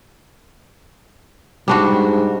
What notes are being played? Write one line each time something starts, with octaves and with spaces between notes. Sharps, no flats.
G#2 G3 D4 F#4